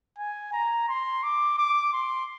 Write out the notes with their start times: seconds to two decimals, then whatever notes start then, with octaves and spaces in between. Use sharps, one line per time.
0.18 G#5
0.53 A#5
0.89 C6
1.23 D6
1.58 D6
1.93 C6